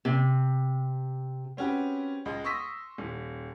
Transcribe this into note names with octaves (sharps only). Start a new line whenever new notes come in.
C3
C4 C#4 F#4 G4 B4
C#2 G#3 D#5
C6 C#6 D#6 E6 A#6 B6
D#1